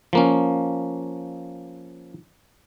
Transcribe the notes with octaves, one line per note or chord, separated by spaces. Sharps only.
F3 A#3 C#4